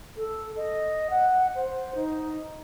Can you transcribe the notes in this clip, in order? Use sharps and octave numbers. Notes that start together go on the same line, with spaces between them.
A4
D#5
F#5
C5
D#4